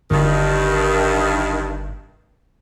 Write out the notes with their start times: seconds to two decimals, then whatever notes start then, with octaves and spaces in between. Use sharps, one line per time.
0.11 G1 G2 D#3